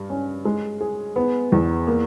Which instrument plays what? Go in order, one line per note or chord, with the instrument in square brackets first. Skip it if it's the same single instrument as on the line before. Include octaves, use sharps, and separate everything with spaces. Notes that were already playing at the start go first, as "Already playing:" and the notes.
Already playing: [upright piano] G2 G4
C#4
G#3
G#4
B3
E2
A#3